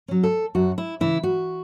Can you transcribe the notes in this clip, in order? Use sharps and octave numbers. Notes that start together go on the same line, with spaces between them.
F#3 C#4
A4
F#2 F#4
E4
C#3 E3 E4
F#4